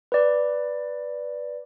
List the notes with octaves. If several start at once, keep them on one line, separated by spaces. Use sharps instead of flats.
B4 D5